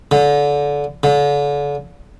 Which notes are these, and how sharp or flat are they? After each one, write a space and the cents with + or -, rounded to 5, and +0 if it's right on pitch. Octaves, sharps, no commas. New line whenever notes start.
D3 -25
D3 -35